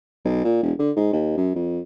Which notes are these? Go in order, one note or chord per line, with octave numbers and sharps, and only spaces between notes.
B1
A#2
E1
D3
G#2
D#2
F#2
F2